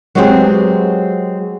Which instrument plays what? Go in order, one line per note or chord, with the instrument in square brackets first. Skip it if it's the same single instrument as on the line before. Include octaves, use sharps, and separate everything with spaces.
[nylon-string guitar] F#3 G#3 B3 C4 G4 G#4